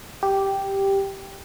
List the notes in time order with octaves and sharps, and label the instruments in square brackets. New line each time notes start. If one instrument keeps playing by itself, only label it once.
[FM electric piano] G4